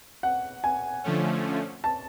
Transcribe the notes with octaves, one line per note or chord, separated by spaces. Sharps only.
F#5
G#5
D3 F3 A3 C#4
A5